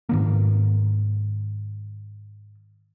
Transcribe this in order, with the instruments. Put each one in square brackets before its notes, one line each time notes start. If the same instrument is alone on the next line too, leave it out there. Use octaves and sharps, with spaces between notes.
[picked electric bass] G#2 D#3 A#3